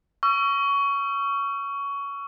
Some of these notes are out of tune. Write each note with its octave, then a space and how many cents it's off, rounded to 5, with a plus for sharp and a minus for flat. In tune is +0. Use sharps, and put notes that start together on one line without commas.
C#6 +20 E6 +40